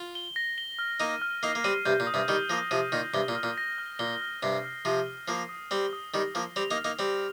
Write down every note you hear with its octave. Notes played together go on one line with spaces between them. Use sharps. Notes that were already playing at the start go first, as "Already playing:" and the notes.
Already playing: F4
G7
A#6
G7
F6
A#3 D#4 D#7
F6
A#3 D#4 C7
A#3
G3 C4 D#7
G2 C3 G6
A#2
D#6
G2 C3
D#3 G3 G7
F3 A#3 A#6
C3 F3 D#7
A#2 D#3 A#6
G2 C3 G7
A#2
F6
A#2
A#6
F6
A#2 G7
F6
G2 C3 C7
F6
C3 F3 D#7
G7
F3 A#3 C7
D#6
G3 C4 G7
D#6
D#3 G3 A#6
F3 A#3 D#6
G3 C4 F7
A#3 D#4
F6
A#3 D#4
G3 C4 A#6